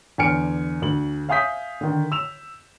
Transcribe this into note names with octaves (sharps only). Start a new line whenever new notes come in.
E2 D3 G#5 F6 C#7 D7
D2 F#7
E5 F5 G#5 D#6 G6 B6
D3 D#3
E6 E7 F7